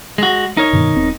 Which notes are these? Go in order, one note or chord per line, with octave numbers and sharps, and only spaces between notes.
G#3 F#4
D#4 A#4 C#5
G2 B2 D#3
D#1 C4